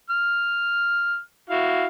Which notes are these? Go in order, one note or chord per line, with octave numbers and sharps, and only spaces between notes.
F6
E4 F#4 F5